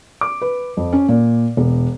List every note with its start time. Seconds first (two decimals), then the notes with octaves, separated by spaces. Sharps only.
0.21 D6
0.42 B4
0.77 F2
0.93 C#4
1.08 A#2
1.57 E1